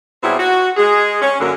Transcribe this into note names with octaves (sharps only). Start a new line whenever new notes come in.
B2 F#3 G3 C4 E4 G#4
F#4
G#3 G#4
C#4
F#2 D3 A#3